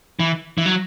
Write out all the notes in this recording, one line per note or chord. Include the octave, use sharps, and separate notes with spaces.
E3
E3
F#3